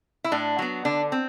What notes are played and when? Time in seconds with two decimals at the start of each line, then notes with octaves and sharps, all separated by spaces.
0.24 E4
0.32 A2 D4
0.59 F#3 B3
0.85 D3 D4
1.12 C4